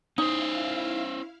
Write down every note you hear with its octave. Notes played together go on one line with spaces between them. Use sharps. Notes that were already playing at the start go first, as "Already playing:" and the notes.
C#4 D#4 E4 C5 F5